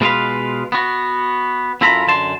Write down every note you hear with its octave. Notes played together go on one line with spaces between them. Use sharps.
B2 G#3 F4 G#4 B4 F5
B3 F#4
F#2 E4 F4 A4 A#5 B5
F#2 D3 A5 C6